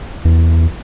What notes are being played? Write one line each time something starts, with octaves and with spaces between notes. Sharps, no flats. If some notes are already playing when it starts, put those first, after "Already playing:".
E2